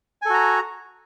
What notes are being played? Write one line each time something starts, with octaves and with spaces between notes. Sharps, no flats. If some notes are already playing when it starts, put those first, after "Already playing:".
F#4 A4 G#5 A#5